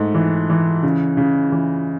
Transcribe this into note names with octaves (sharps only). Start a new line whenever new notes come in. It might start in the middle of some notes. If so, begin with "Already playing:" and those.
Already playing: G#2 A3
E3
E3
C#3
C#3
E3